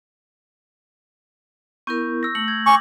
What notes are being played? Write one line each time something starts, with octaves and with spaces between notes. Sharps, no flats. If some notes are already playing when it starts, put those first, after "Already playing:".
B3 E4 A#4 C#6 G6
E6 A#6
A3 F#7
G6 G#6
G#5 C#6 D6